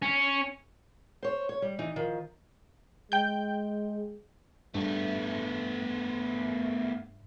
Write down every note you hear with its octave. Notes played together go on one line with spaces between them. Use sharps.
C#4
C5 C#5
C#5
G3
E3 D#4
D#3 F3
G#3 G5 G6
G2 A3 B3 E5